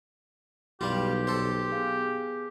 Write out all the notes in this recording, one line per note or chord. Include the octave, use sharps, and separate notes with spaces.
B1 G3 E4 F4 G4 B4
A4 C5 C6 G6
B3 G#4 F5